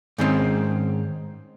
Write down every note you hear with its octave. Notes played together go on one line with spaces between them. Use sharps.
G#2 D#3 G#3 C4 C#4